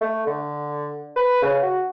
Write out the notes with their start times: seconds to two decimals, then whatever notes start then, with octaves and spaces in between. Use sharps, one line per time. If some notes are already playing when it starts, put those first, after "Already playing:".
0.01 A3
0.27 D3
1.16 B4
1.42 C#3
1.63 F#4